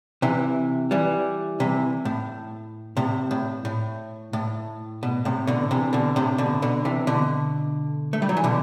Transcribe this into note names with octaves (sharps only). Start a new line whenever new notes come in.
C3 E3
E3 G3
C3 E3
A2
A2 C3
A2
A2
A2
B2
A2 C3
B2 D3
C3 E3
B2 D3
A2 C3
B2 D3
B2 D3
C3 E3
B2 D3
A3
G3
F#3
E3
B2 D3